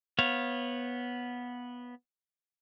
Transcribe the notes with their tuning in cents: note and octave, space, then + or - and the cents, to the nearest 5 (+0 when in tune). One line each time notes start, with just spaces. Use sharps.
B3 -10 C#5 -25 F5 +0